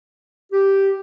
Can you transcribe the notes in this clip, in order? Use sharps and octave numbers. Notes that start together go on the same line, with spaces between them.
G4